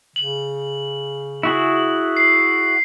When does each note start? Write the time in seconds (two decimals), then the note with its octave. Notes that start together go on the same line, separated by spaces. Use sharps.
0.16 C#3 F#7
1.43 E4 F#4 G#4
2.17 C7